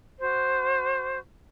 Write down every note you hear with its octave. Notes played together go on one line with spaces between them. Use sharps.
F#4 C5